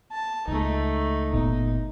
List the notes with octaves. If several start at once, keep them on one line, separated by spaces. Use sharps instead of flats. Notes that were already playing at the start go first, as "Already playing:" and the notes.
A5
C#2 A3 D#4
G1 A#2 B3 D#4